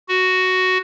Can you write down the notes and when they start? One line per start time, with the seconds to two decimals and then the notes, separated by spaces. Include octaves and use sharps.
0.09 F#4